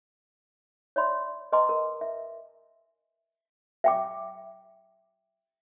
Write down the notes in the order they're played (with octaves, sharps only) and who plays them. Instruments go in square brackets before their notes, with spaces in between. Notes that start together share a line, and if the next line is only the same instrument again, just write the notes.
[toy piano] C#5 D5 E5 B5 C6
B4 D#5 G#5 A#5 C6 D6
A#4
E5
E5 G5 D6